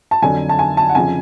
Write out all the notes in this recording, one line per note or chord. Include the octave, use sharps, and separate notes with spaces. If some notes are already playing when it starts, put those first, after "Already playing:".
A5
F2 D3 F#3 G#5
A5
G#5
A5
F#5
F2 C#3 F3 G#5